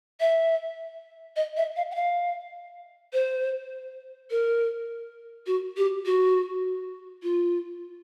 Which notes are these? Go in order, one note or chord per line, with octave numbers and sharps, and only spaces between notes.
E5
D#5
E5
F5
F#5
F5
C5
A#4
F#4
G4
F#4
F4